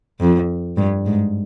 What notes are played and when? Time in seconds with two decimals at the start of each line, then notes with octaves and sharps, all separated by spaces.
0.20 F2
0.77 G2
1.06 G#2